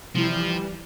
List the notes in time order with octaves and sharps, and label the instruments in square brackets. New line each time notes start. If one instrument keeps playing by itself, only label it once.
[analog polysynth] C3 G3 E4 [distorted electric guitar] F3
[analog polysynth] E3 G3